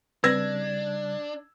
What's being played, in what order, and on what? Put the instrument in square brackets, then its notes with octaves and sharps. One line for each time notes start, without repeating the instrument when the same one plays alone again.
[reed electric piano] C#3 G3 [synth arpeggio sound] C4 B4 [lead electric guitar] D4 [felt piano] E6 G#6 A#6